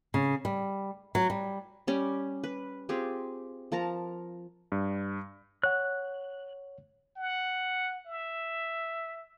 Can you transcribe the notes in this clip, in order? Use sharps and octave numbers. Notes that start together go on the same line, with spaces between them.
C#3
G3
F#3
G3
G3 C#4 G4
B4
C4 F4 G4 G#4
F3 A#4 A5 A#5
G2
C#5 F#5 F#6
F#5
E5